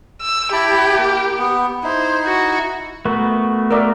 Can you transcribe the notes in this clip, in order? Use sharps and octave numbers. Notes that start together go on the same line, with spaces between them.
E6
E4 G4 A5 B5
A#3
B3
D#4 E4 C5
F#4
A3 B3 F#4 A#4
A#4 D5 E5